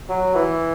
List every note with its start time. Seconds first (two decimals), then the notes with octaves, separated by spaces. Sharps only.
0.09 F#3
0.35 E3